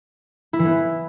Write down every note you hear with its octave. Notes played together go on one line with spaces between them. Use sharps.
E4
E3
B3